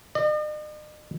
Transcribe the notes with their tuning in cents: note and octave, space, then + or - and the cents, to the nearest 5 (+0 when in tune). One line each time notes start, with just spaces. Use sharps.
D#5 -45